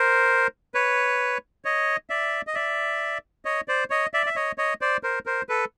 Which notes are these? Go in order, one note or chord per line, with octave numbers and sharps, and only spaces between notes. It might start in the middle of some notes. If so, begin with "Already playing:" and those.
Already playing: A#4 C5
B4 C#5
C#5 D#5
D5 E5
D#5
D5 E5
C#5 D#5
C5 D5
C#5 D#5
D5 E5
E5
C#5 D#5
C#5 D#5
C5 D5
A#4 C5
A#4 C5
A4 B4